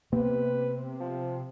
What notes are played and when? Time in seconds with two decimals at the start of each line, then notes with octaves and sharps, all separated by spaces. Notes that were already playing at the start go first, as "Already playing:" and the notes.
0.13 C3 A#3 B3 B4
1.00 F3